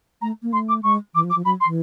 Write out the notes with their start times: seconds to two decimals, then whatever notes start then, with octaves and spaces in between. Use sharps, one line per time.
0.22 A3 A#5
0.43 A#3
0.53 A3 C6
0.69 D6
0.83 G#3 C#6
1.14 E3 D6
1.24 F3
1.30 D6
1.35 F3
1.45 F#3 B5
1.61 C6
1.66 E3